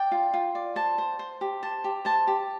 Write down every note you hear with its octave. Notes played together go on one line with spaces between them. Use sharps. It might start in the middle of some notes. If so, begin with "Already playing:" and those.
Already playing: D5 G5
F4
F4
D5
C5 A5
C5
C5
G4
C5 A5
G4
C5 A5
G4